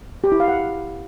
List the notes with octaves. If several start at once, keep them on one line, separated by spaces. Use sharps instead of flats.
G4
E4
F5
F#5